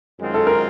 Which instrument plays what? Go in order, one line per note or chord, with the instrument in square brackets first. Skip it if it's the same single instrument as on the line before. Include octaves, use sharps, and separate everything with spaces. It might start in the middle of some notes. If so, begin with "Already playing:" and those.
[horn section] F#2 D#3 G#3 C4 F4
[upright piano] A4
A#4